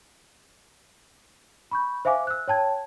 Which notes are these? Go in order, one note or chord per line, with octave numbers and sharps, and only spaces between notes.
B5 C#6 G6
C5 E5 F5 G#5 D6
E6 F#6
C#5 G5 A5 G#6